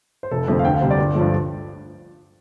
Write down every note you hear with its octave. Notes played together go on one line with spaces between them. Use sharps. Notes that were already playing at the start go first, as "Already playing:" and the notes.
C5
F1 A4
F2 D3 A3 C4
F5
D2 G5
F5
C3 G3 C4 C5
D5
G1
G2 F3 A3